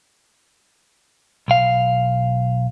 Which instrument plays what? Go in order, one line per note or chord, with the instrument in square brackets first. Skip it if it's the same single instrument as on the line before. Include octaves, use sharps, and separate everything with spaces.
[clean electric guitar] B1 F5